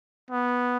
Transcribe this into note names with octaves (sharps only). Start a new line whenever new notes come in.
B3